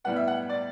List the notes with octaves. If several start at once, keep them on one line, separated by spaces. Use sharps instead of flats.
A2 G3 B3 F#5
E5
F#5
D5